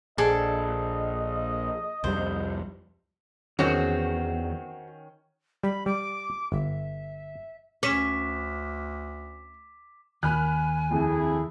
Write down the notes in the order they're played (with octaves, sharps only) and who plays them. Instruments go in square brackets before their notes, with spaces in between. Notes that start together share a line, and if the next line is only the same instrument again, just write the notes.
[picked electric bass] A#1 [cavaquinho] G#4 A4 D5 [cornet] D#5
[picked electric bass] C2 F2 G3 [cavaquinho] C5
[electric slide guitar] E2 [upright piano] D#3 C#4 [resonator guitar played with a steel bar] C4 F#4
[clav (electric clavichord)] G3 [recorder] B5
[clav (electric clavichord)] G3 [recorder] D6
[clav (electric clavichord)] G1 [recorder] E5
[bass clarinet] D2 [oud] C#4 [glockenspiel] D6 B6 E7
[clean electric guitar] D#2 [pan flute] G#5 [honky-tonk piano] B5 F6 F#6
[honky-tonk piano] F2 [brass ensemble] E4 G#4